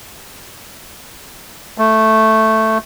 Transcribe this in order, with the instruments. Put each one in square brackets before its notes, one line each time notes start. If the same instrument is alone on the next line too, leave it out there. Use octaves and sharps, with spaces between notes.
[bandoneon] A3